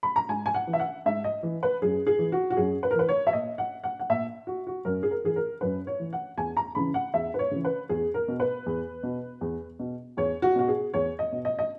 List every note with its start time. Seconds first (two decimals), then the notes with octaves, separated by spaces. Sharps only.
0.03 B5
0.16 A#5
0.29 G#2 G#5
0.46 G#5
0.54 F#5
0.67 E3
0.73 E5
0.80 F#5
1.06 G#2 E5
1.24 D#5
1.43 E3
1.63 B4
1.82 F#2 G#4
2.07 G#4
2.19 E3
2.32 F#4
2.50 F#4
2.57 F#2 G#4
2.83 B4
2.91 A#4
2.95 E3 B4
3.09 C#5
3.27 E5
3.33 A#2 D#5
3.58 F#5
3.84 F#5
4.00 F#5
4.10 A#2 E5
4.47 F#4
4.67 F#4
4.85 F#2 A#4
5.03 G#4
5.11 A#4
5.24 E3 G#4
5.36 A#4
5.61 F#2 B4
5.87 C#5
6.00 E3
6.13 F#5
6.37 E2 G#5
6.57 A#5
6.75 C#3 E3 B5
6.94 F#5
7.14 E2 E5
7.34 B4
7.39 C#5
7.51 C#3 E3
7.65 B4
7.89 E2 G#4
8.14 A#4
8.28 B2
8.40 B4
8.66 E2
9.03 B2
9.41 E2
9.79 B2
10.17 E2 C#5
10.42 F#4
10.56 B2 F#4
10.68 G#4
10.94 E2 C#5
11.19 D#5
11.32 B2
11.45 D#5
11.59 D#5